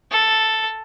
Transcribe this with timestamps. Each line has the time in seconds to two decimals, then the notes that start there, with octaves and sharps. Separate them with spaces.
0.11 A4